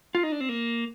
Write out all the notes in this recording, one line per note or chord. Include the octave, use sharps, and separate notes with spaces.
F4
D#4
D4
C4
A#3